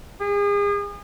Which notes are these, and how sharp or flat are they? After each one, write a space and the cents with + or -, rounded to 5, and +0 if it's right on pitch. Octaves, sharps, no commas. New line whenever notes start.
G#4 -35